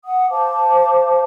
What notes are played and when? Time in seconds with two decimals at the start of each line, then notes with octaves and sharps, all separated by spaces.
0.04 F#5 D#6
0.31 C5 F5 A5 D6